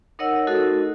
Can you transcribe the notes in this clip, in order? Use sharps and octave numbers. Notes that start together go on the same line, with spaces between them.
D#4 A#4 C#5 D#5 F#5 E6
A3 D#4 F#4 A4 A#4 D#5